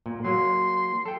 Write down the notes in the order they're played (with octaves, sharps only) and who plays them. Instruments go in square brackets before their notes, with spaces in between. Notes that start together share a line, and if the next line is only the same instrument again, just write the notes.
[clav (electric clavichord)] A#2
[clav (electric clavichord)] F#3 A#3 [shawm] C6
[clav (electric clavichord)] A4 G5